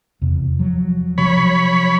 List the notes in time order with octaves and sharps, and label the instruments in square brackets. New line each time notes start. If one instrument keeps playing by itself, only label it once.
[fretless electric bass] E2 C3
F3 F#3
[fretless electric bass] C3 F3 F#3 [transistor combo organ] C#5 B5